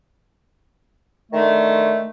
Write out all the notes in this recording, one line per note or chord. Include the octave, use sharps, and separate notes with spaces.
D3 D#3 A3